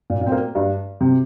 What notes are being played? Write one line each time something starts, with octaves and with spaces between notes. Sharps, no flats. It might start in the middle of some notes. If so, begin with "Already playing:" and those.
A#2
A#2
C4
A#3
G2
C3